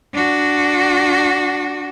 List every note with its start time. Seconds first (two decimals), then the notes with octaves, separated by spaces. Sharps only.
0.14 D4 F#4